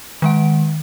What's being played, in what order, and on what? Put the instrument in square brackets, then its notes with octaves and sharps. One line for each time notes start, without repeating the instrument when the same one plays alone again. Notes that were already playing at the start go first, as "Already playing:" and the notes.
[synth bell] D#3 G#3 F#5